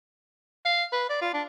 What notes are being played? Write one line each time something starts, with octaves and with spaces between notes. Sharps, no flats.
F5
B4
D5
F4
D4